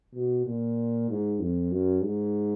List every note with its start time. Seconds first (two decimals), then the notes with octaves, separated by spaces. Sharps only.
0.14 B2
0.47 A#2
1.10 G#2
1.40 F2
1.72 F#2
2.04 G#2